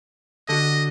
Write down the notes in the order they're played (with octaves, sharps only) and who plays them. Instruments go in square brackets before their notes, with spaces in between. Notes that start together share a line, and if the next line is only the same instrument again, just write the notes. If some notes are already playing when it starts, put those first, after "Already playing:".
[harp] D3 F#4 [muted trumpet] D#5